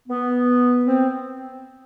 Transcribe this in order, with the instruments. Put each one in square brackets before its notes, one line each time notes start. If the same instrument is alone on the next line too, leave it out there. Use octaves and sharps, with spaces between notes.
[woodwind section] B3
C4